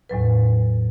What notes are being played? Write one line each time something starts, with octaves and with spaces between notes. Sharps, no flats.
E2 A2 F#3 B4